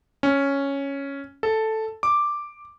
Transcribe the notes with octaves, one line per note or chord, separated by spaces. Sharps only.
C#4
A4
D6